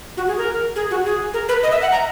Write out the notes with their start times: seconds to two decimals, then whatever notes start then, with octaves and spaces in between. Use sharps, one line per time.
0.17 F#4
0.28 G#4
0.38 A#4
0.76 G#4
0.91 F#4
1.05 G#4
1.34 A#4
1.49 B4
1.63 D#5
1.72 E5
1.82 F#5
1.92 A#5